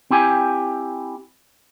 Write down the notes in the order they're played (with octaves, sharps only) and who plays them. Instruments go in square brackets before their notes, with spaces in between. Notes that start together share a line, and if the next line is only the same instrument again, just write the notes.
[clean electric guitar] C4 E4 G4 G#5